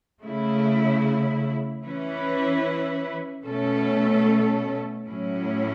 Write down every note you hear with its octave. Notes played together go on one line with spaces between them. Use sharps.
C#3 A3 E4
E3 C#4 E4 B4
B2 A3 C#4 A4
A2 F#3 C#4 E4